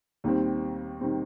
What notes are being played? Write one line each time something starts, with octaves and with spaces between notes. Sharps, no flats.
D#2 D#3 G3 C4
D#3 G3 C4